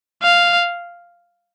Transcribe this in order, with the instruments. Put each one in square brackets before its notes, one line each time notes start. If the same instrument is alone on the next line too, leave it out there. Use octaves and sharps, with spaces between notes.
[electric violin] F5